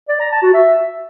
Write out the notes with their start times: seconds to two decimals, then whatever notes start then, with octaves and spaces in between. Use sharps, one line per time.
0.09 D5
0.20 A#5
0.31 A5
0.42 F#4
0.54 E5